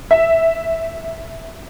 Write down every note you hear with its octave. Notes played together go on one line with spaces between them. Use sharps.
E5